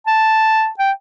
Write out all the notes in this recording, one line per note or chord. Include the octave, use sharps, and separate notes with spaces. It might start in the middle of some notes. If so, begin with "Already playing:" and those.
A5
G5